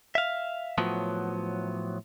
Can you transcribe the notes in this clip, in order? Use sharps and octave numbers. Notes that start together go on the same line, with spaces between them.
E5 F5
A2 F3 F#3 B3